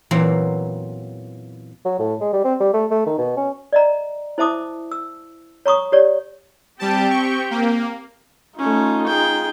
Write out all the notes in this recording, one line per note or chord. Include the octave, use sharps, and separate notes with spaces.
E2 A#2 E3 F#3 A#3 C4
F#3
A2
G#3
G3
C4
G3
A3
A3
D#3
B2
C#4
D5 D#5 A#5
E4 C5 E5 A5 D6 D#6
E6
C#5 A#5 C#6 D#6
G4 C#5 D5
G3 C4 G4 G5 A5
C#6
A#3
A3 C#4 D#4 F4
G#4 G5